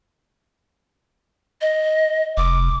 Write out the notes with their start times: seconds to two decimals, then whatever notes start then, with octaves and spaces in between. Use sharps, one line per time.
1.61 D#5
2.37 F1 D6